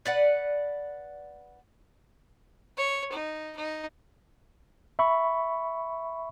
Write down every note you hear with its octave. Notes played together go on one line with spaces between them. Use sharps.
B4 D5 F#5
C#5
D#4
D#4
E5 B5 C#6